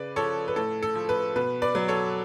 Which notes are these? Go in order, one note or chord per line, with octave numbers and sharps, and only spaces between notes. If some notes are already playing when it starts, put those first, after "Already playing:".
Already playing: C#3 B4 D5
F3 A4 C#5
B4
A2 A4
A4
F3
B4
B2 B4
B4 D5
F#3
A4 C#5